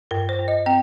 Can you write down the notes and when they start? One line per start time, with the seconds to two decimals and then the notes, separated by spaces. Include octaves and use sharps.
0.11 G2 A#4
0.29 C5
0.39 G2
0.48 D#5
0.66 C4 G5